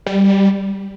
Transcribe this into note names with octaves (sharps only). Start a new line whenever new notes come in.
G3